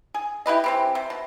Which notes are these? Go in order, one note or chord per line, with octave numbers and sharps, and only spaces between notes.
G#4
E4 G4 B4 D#5
E3 C4 G4
C3
B2